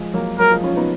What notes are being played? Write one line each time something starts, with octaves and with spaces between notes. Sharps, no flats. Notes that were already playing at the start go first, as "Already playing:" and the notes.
Already playing: F3 G#3
F#3 A#3
F#3 A#3 A#4
F3 G#3
C#4 F4
B3 D#4